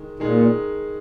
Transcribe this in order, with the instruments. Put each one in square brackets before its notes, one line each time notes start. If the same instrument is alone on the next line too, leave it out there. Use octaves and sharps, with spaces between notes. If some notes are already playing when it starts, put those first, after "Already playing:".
Already playing: [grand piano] D#3 G#3
[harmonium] A#2 [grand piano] D#3 G#3 D#4 G#4